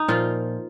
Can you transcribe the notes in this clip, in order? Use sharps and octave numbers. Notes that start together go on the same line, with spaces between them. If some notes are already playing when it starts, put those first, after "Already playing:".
Already playing: D#4
A#2 F3 F4